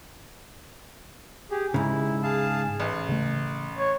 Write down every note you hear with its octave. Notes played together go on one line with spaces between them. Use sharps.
G4 G#4
G#2 C#3 E4
G#4 F5 A5
A1
C#3 A3
C#5